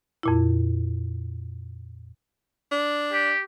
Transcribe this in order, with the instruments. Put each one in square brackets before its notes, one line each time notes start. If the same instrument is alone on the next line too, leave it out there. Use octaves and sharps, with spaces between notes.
[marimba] F2 A#2 E4
[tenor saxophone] D4
[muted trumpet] G4